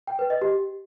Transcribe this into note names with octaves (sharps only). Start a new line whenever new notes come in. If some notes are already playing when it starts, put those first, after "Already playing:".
G5
B4
D#5
G4